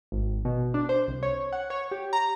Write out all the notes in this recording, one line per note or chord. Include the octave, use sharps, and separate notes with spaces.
G#1
B2
D4
C5
C2
C#5
F#5
C#5
G4
A#5